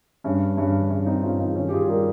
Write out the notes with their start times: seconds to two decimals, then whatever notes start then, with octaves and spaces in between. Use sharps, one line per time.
0.24 G2 C#4
0.57 G2 C#4
0.90 G2 C#4
1.06 C4 D#4
1.23 G2 C#4 F4
1.39 C4 D#4
1.55 D#3 C#4
1.68 G4
1.72 F4 G#4
1.88 G3 G4 A#4